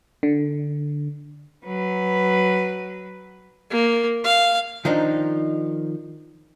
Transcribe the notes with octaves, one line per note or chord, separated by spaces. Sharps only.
D3
F#3 B4
A#3
F5
D#3 F3 D4 D#4